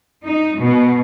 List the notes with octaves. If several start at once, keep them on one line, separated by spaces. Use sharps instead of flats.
D#4
B2